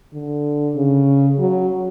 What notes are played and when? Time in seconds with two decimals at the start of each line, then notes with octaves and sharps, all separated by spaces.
0.13 D3
0.76 C#3
1.39 F#3